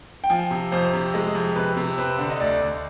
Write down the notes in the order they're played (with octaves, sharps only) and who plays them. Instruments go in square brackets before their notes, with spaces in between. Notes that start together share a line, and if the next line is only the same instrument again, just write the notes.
[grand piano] G5
F3 G#5
C3
F2 C5
C3
G#3 D#5
F2
C3 B4
C3
C4 B4
D3
D#5
D2 D5
D2